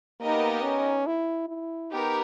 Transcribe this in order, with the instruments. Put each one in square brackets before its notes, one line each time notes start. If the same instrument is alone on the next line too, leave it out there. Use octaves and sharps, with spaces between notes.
[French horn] A#3 [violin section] B3 D#4 G4 A#4 D#5
[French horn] C#4
E4
E4
[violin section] B3 G4 A#4 [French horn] D#4